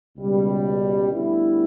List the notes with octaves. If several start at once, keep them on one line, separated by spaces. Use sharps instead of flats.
C#2 B2 G3
D2 D3 G3 B3 E4